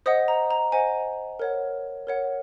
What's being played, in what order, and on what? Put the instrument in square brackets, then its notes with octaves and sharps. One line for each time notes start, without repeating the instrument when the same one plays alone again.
[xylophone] C5 D#5 F#5 D#6
A#5
A#5
C5 D#5 F#5 G#5
A#4 C#5 F#5
A#4 C#5 F#5